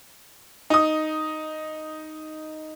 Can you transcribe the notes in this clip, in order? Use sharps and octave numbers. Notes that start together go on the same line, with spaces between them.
D#4 D#6